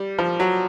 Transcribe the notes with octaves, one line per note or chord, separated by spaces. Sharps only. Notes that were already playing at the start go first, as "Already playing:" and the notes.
Already playing: G3
F3
F#3